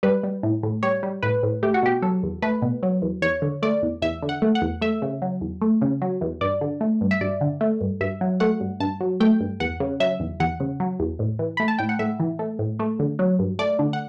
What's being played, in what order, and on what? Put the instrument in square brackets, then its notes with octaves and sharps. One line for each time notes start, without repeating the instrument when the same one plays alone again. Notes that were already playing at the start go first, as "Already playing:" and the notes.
[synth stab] G3 B4
G3
A2
A2
G3 C#5
G3
A2 B4
A2
A3 G4
F#4
B2 G4
F#3 A4
E2
A3 B4
B2
F#3
E2
E2 C#5
D3
A3 D5
E2
E2 E5
D3
F#5
A3
F#5
E2
A3 E5
C#3
F#3
E2
A3
C#3
F#3
E2
G2 D5
D3
A3
G2
E5
G2 D5
D3
A3
G2
G2 E5
F#3
A3 F#5
G2
G2 A5
F#3
A3 G5
G2
E2 F#5
C#3
F#3 E5
E2
E2 F#5
C#3
F#3
E2
A2
E3
A3 B5
A5
A2 G5
F#5
A2 E5
E3
A3
A2
A3
D3
F#3
G2
A3 D5
D3
F#5